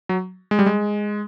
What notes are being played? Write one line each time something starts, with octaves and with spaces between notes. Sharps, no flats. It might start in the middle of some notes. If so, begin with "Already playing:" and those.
F#3
G#3
G3
G#3